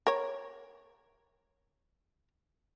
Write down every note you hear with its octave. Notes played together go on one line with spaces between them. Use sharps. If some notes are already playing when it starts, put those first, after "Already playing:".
A#4 C#5